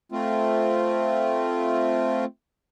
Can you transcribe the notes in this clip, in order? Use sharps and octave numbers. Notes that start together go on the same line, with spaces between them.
A3 C4 F4